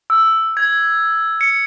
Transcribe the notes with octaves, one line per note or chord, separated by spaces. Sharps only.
E6
G#6
C#7